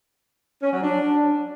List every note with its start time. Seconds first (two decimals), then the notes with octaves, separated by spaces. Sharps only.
0.62 C#4
0.73 F#3
0.83 D4